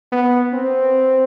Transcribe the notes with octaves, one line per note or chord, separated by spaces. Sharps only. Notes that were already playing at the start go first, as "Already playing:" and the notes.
B3
C4